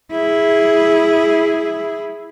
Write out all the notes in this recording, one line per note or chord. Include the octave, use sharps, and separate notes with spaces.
E4 G#4